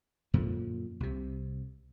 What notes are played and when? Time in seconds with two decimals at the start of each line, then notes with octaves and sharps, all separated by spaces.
0.34 F#2 A#2 D3 F3
1.00 C2 C3